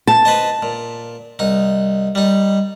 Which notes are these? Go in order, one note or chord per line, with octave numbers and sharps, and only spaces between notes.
A5
B4 C5 D#5
A#2
C2 D#4
G3 D#4